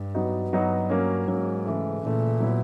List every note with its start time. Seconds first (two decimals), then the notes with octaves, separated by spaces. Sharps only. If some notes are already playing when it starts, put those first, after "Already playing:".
Already playing: G2
0.15 F#3 B3 D#4 F#4
0.52 G2 F#3 B3 D#4 F#4
0.90 F#3 A#3 C#4
1.28 G#2 F#3 A#3 C#4
1.65 C#3 E3 A3
2.02 A#2 C#3 E3 A3
2.40 F#3 B3 E4